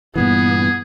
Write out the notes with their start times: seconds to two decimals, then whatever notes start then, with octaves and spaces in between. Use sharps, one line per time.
0.16 G2 A#2 E3 B3 G#4